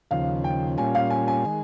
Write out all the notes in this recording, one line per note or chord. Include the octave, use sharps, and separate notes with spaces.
D#2 C#3 F3 F5
G5
A#2 G3 C#4 F4 G#5
F5
G#5
G#5
D#3 G#3